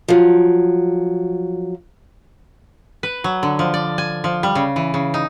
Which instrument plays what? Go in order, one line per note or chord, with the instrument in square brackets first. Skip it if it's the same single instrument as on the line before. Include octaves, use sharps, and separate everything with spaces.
[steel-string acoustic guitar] F3 F#3
[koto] B4
F#3
D3
F3
D5
G#5
F3
G3
C#3
E3
C#3
D#4